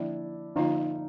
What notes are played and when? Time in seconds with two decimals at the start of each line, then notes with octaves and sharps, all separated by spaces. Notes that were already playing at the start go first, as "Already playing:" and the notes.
Already playing: D3 F3 A#3 D4 E4
0.56 D3 F3 A#3 C#4 D#4 F4